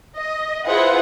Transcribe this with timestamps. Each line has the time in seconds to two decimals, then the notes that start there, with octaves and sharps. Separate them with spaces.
0.16 D#5
0.65 E4 F4 G#4 B4 C5 F#5